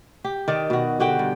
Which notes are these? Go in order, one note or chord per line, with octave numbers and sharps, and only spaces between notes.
G4
D#3 D5 D#5
B2 F#4
D3 F#4 G4 G5
G2